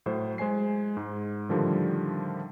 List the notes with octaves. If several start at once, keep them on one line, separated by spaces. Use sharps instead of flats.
A2 F#3 C5
G#3 C5 G#5 C7
G#2
A2 D3 D#3 F3 G3